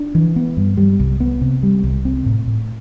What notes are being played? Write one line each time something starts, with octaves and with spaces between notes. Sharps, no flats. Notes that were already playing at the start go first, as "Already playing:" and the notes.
Already playing: D4
E3
B3
G2
G3
C2
B3
C3
G3
C2
C4
A2
A2